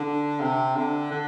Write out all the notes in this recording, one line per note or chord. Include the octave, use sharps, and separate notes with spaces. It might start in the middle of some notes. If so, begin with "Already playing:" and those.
Already playing: D3
C3
D3
D3